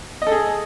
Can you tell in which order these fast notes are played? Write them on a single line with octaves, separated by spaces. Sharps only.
D#5 A4 G#4